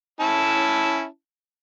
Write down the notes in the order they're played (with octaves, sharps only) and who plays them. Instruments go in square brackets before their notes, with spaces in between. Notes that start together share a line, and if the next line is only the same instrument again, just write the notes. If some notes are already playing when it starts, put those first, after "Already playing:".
[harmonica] C#4 E4 A5